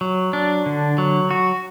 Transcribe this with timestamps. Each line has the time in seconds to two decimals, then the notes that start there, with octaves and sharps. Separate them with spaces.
0.01 F#3
0.33 D4
0.66 D3
0.98 F#3
1.31 F#4